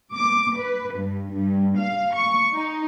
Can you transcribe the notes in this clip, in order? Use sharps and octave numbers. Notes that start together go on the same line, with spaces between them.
D6
B4
G2
G2
F5
C#6
D#4